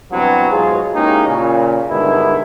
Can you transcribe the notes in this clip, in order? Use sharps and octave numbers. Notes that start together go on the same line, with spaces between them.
G2 B2 E3 F#3 C4 B4
G#2 B2 F#3 F4 G#4
G#3 A#3 C#4 D#4 E4 G4
A#2 C#3
G2 B2 D3 D#3 G#3 E4